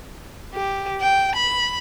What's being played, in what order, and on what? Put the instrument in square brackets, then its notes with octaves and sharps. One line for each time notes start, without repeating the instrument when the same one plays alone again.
[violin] G4
G5
B5